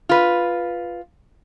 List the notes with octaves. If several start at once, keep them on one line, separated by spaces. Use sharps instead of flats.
F4 B4